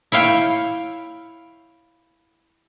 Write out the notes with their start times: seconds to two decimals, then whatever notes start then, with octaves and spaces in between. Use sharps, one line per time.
0.12 E4 C#5 F5 G5